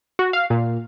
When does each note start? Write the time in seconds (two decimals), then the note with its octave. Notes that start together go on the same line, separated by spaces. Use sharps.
0.19 F#4
0.33 F5
0.50 A#2